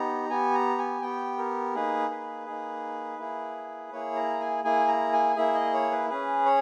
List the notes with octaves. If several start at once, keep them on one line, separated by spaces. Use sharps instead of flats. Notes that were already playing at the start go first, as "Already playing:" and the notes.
Already playing: B3 D#4 G4 A#5
B3 G4 G#5
A#5
G#5
B3 G4 G5
A#4
A#3 D#4 G#4 B4
B4
A#3 D#4 G#4
A#3 E4 G#4
A#3 E4 G#4 C#5
A#5
G#5
A#3 E4 G#4 G#5
A#5
G#5
A#3 E4 G#4 E5
D#5
C#5
B4
C#4 G#4 B4
C#5